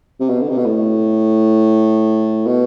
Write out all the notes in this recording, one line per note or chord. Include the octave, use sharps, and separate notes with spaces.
C3
B2
D3
C3
B2
A2
B2